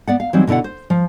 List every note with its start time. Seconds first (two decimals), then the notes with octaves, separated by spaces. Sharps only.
0.08 B3 D5 F#5
0.20 F5
0.33 E3 F#3 G3 C4 D#4
0.47 B2 D3 E4 D5 F#5
0.64 C5
0.90 F3